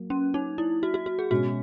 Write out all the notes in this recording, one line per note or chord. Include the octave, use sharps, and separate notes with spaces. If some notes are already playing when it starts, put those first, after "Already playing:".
Already playing: F#3 A#3
C#4
D#4
E4
F#4
F#4
F#4
G#4
B2 G#3 C#4 F#4